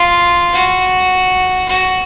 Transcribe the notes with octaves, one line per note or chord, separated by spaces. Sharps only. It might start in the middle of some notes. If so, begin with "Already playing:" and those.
Already playing: F4
F#4
F#4